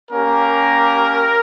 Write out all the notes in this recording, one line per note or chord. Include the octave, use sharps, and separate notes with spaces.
A#3 C#4 G4 A#4